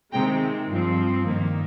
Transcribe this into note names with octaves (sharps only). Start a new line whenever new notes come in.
C3 D#3 G#3 C4 G5 A#5
G2 F3 C4
G2 D#3 A#3